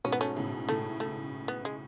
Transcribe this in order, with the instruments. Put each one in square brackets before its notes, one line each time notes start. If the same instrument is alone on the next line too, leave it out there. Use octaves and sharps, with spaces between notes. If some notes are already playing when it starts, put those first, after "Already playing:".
[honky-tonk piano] G#2 B2 [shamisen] C#4
[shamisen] B3
A3 C#4
[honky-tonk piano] A2 C#3
[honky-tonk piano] A2 C#3 [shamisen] A3
[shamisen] A3
B3
G#3